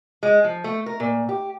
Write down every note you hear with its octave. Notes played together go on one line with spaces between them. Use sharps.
G#3
F3
A3
A#4
A#2
G4